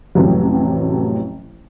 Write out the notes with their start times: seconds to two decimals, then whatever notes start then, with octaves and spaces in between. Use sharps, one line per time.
0.15 A1 F2 A2 C3 F#3